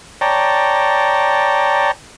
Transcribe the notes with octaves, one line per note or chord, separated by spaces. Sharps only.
C#5 D5 G5 A5 A#5